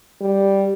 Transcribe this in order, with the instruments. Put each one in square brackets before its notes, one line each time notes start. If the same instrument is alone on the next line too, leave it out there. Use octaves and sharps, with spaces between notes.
[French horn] G3